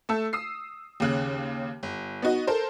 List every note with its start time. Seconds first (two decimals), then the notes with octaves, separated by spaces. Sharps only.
0.09 A3 A5 E6
0.33 D#6 E6 C7
1.00 D#2 C#3 F#6
1.83 G1
2.22 B3 D#4 F#4 D#5
2.47 A4 A#4 C5